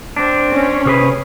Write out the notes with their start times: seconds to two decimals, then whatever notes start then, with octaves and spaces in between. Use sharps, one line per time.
0.16 C4 D4
0.52 C#4
0.85 C3 G#4 B4